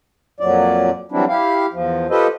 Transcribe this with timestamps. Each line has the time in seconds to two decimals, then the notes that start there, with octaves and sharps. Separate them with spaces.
0.40 F2 A#2 F#3 D5
1.12 E3 F#3 G3 C4 D4 E4
1.29 E4 G4 F5
1.73 E2 F3
2.10 F4 G4 A4 B4 C5 D#5